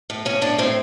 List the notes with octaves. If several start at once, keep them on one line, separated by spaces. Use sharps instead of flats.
A2
A2 C#4
A2 D4
A2 C4